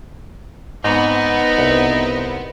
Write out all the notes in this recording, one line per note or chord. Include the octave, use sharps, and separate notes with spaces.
G#2 B3 C4 D#4
C2 F#5